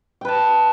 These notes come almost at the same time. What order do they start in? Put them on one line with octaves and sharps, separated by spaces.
G5 B4 A5